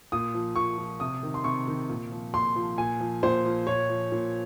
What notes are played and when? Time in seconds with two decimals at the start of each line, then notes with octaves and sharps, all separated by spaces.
0.12 A#2 D#6
0.34 F3
0.56 A#2 C#6
0.78 F3
1.00 C3 D#6
1.23 D#3
1.34 C6
1.44 C3 C#6
1.67 D#3
1.89 A#2
2.12 F3
2.34 A#2 C6
2.56 F3
2.77 A#2 G#5
3.00 F3
3.23 A#2 C5
3.45 F3
3.67 A#2 C#5
3.89 F3
4.12 A#2